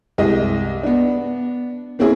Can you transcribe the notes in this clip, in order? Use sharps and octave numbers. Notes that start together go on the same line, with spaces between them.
C2 G#3 G4 D#5
B3 D4
A#3 C4 C#4 E4 G#4